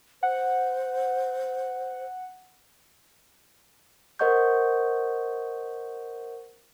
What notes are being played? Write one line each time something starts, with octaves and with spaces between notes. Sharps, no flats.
C5 F#5
A#4 C5 D#5 F#5 C#6 G6